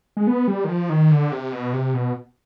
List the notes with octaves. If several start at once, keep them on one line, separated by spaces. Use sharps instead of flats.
G#3
B3
G3
D#3
F3
D#3
D3
C3
B2
C3
B2